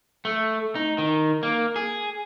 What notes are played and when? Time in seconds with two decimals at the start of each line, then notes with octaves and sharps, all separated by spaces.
0.25 A3
0.75 D#4
0.98 D#3
1.43 A#3
1.76 G#4